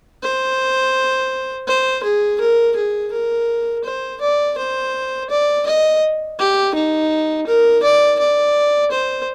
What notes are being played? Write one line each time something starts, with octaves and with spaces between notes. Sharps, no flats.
C5
C5
G#4
A#4
G#4
A#4
C5
D5
C5
D5
D#5
G4
D#4
A#4
D5
D5
C5